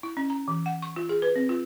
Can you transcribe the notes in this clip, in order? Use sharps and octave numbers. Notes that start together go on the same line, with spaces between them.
E4
C#4
A#5
E3
F#5
C#6
F4
G#4
B4
C4
F4